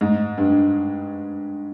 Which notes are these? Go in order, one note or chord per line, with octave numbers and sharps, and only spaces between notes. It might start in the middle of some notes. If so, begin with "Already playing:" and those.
G#2
G2